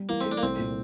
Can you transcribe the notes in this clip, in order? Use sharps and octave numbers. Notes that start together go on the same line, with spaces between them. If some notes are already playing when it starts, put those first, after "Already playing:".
Already playing: G3
E3 A#3
A3 C4
D4
A#3
C2 C4
A#2